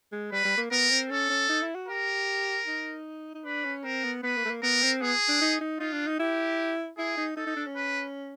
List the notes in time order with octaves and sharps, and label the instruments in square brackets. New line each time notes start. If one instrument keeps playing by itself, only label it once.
[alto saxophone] G#3
[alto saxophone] G3 [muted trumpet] B4
[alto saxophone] G3
A#3
[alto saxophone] B3 [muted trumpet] A#4
[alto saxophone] C4
[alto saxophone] C#4 [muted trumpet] A4
[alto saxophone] C#4
D#4
E4
F#4
[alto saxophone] G4 [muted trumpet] A#4
[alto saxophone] D#4
D#4
[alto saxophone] D4 [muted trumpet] B4
[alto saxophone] C#4
[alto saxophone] C4 [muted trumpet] A#4
[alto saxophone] B3
[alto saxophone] B3 [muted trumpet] B4
[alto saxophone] A#3
A3
A#3
[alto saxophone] B3 [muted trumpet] A#4
[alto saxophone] C4
[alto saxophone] B3 [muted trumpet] G#4
[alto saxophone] D4
D#4
D#4
[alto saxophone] D#4 [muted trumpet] F4
[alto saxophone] D4
D#4
[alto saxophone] E4 [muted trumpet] G4
[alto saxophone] E4 [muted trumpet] G#4
[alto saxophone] D#4
[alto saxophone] D#4 [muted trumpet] A4
[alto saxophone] D#4
D4
C#4
[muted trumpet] B4